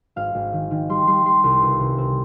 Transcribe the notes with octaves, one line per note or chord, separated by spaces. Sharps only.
G#1 F5
G#1
D#3
D#3
G3 C6
G3 C6
G3 C6
C2 C6
C#2
C3
C4